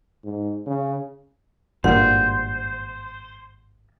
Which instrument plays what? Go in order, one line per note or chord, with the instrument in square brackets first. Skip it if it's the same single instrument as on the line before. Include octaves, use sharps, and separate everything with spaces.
[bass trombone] G#2
C#3
[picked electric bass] G#1 G2 A#2 [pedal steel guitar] C5 [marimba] F#5